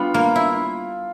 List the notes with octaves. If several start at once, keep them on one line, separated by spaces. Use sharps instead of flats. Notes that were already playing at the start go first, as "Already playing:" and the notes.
Already playing: G3 B3 D4 F4
A#3
E4